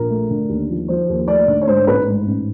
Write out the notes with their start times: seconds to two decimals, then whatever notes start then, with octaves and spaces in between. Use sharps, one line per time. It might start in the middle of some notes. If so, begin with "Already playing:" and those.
Already playing: A#1 A#4
0.10 A3
0.30 D3
0.49 D#2
0.70 F3
0.88 F3 C5
1.09 D#2
1.28 A3 D5
1.47 D3
1.61 C#5
1.68 G#2 C5
1.87 A1 B4
2.07 G#2
2.27 A1